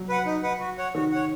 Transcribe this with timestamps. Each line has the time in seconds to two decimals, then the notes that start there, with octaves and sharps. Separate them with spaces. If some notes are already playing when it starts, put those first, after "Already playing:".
Already playing: F#3
0.09 B4 F#5
0.26 D#4
0.43 B4 F#5
0.60 F#4
0.77 C#5 F#5
0.94 D#3 F#4
1.11 C#5 F#5